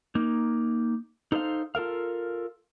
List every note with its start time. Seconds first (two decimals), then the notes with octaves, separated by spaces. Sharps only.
0.15 A#3 D#4
1.32 D#4 A4 C5 D5 F5
1.75 F4 A4 A#4 F5